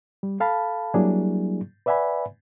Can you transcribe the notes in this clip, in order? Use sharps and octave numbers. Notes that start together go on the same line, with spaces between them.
G3
A4 F5 A5 B5
F#3 G3 A#3 D4 E4 G#4
B4 D5 E5 F#5 G#5 B5